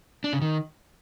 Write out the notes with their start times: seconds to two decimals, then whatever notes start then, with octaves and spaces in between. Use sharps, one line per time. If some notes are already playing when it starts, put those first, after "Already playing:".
0.24 D4
0.33 C#3
0.42 D#3